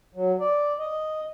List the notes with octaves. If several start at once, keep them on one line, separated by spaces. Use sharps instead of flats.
F#3
D5
D#5